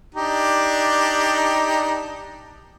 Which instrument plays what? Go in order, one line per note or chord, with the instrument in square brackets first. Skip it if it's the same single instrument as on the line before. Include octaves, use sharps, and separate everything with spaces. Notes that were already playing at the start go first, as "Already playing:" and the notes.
[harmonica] D4 D#4 G4